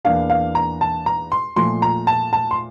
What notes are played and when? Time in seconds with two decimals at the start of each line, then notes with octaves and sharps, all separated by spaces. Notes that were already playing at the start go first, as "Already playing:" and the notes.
0.05 E2 E3 A#3 D4 F5
0.30 F5
0.55 A#5
0.81 A5
1.06 A#5
1.32 C6
1.56 A#2 F3 A3 C6
1.82 A#5
2.07 A5
2.33 A5
2.51 C6